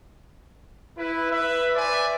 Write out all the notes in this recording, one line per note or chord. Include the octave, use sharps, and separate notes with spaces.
E4 B4
B4 E5
B4 C5 D5 E5 G#5